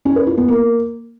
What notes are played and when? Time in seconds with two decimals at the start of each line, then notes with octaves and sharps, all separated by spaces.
0.05 C#4
0.16 B4
0.27 F4
0.37 B3
0.48 A#3